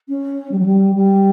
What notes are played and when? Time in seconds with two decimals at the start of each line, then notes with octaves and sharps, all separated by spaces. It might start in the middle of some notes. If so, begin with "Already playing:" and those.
0.08 C#4
0.51 G3
0.59 F#3
0.66 G3
0.95 G3